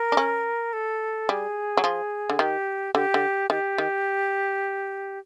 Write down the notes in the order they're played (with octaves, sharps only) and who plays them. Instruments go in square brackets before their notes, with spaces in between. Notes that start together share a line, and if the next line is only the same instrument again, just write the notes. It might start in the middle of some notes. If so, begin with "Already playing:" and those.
Already playing: [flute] A#4
[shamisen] D4
C#4
[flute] A4
[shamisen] G3 [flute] G#4
[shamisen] F#3
F3
D3
[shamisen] D#3 [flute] G4
[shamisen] D3 [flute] G4
[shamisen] D3
[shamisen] D#3 [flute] G4
[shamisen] D#3